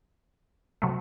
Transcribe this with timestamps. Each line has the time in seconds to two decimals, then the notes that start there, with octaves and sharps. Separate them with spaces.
0.82 C3 F#3 A3